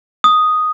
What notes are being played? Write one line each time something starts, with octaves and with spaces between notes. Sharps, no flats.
D#6